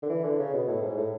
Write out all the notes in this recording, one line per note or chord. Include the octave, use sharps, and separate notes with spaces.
D3
E3
D3
C#3
B2
A2
G#2
A2